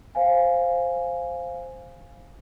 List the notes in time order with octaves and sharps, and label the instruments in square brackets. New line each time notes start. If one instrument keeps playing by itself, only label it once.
[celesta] C5 F5 G#5